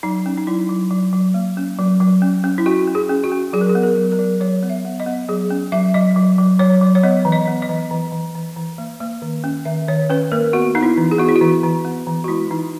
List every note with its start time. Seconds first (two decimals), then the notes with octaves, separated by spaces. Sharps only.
0.03 F#3 D#4
0.26 C#4
0.37 D#4
0.47 F#3 E4
0.69 F#3
0.91 F#3
1.13 F#3
1.34 A#3
1.57 C#4
1.79 F#3
2.00 F#3
2.22 C#4
2.44 C#4
2.58 E4
2.66 C#4 F#4
2.87 C#4
2.95 G#4
3.09 C#4
3.24 F#4
3.32 C#4
3.53 F#3 G#4
3.61 A#4
3.69 G#4
3.75 B3
3.83 A#4
3.97 F#3
4.12 A#4
4.19 F#3
4.40 F#3 C#5
4.63 B3
4.70 E5
4.85 B3
5.00 D#5
5.06 B3
5.29 F#3 G#4
5.50 C#4
5.72 F#3 E5
5.94 F#3 D#5
6.16 F#3
6.38 F#3
6.59 F#3 C#5
6.81 F#3
6.95 C#5
7.03 B3 D#5
7.25 E3
7.32 D#5
7.47 B3
7.62 D#5
7.69 E3
7.91 E3
8.12 E3
8.35 E3
8.56 E3
8.78 A#3
9.00 A#3
9.22 D#3
9.44 C#4
9.65 D#3 E5
9.88 D#3 C#5
10.10 C#4 B4
10.32 A#3 A#4
10.53 B3 F#4
10.75 B3 D#4
10.83 E4
10.97 E3
11.11 G#4
11.18 B3 F#4
11.29 E4
11.36 F#4
11.41 E3
11.63 E3
11.85 B3
12.07 E3
12.24 F#4
12.28 G#3 E4
12.50 E3 D#4